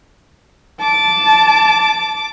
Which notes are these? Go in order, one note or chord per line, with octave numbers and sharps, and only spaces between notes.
A5 D6